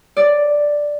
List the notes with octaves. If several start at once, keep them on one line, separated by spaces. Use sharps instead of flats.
D5